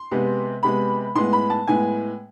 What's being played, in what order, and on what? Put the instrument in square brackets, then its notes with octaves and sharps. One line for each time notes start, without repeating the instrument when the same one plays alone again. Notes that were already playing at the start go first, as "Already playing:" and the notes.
Already playing: [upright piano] C6
C3 G#3 B3
C3 G#3 B3 B5
A2 G#3 B3 C6
B5
A5
A2 G#3 B3 G#5